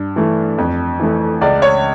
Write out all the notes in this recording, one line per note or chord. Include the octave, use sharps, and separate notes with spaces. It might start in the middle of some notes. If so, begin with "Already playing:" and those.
Already playing: G2
E3 A3
F2
E3 A3
C#2 D5
C#5